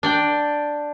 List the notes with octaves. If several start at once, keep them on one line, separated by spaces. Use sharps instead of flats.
D4 D5 G5